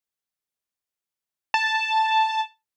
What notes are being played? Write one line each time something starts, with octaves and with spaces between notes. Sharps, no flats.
A5